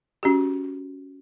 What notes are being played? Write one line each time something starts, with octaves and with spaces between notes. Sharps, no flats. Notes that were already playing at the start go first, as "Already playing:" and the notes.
C#4 F#4 G4